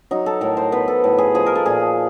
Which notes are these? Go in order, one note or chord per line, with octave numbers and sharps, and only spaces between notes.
F#3 D#4
A4
A2 A#4
C5
B3 B4
A4
A2
G#4
F3 G#4
A#4
A4
A#2 G#4